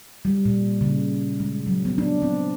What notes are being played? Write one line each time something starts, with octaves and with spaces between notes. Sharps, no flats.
G3
A#2
C#3
G#3
F#3
B3
D4
C4